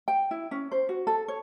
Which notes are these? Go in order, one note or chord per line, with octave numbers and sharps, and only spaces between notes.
G5
E4
C#4
C5
F#4
A4
C#5